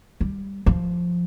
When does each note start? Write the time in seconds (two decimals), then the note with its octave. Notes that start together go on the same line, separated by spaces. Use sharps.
0.21 G3
0.66 F3